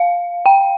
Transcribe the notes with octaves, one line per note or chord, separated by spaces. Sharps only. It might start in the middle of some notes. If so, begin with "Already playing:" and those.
Already playing: F5
G5